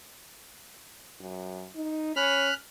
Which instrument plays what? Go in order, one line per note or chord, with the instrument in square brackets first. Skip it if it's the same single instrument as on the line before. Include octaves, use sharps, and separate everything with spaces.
[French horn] F#2
D#4
[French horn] C#4 [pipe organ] B5 F6 F#6